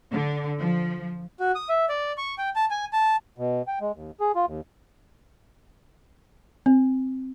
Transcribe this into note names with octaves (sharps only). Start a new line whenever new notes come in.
D3
F3
F#4
D#6
E5
D5
C#6
G5
A5
G#5
A5
B2
G5
G#3
D#2
G#4
F4
D#2
C4